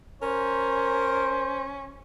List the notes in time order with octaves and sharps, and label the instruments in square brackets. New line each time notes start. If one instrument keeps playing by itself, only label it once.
[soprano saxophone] C#4 [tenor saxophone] A#4 [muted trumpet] C5